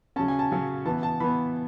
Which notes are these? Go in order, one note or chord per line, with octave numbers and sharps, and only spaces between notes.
C#3 F#3 C#4 A5
G#5
A5
C#3 F#3 C#4
E3 B3 A5
A5
E3 B3 B5